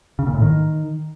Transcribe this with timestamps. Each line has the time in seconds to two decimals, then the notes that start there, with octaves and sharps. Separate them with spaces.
0.19 C#3
0.27 A#2
0.34 A2
0.42 D#3